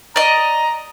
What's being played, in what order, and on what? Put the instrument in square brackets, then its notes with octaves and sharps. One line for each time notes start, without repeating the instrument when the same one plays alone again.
[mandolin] D5 D#5 [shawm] A#5